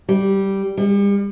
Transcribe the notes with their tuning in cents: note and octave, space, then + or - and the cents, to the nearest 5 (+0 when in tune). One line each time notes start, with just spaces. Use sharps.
G3 -10
G3 +40